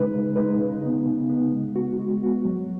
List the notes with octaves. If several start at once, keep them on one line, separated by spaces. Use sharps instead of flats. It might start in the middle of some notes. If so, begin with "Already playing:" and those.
Already playing: C#3 G#3 D#4 B4
C#3
G#3 D#4 B4
C#3
B3 D#4
C#3
B3 D#4
G#3
B3 F#4
G#3
B3 F#4
F#3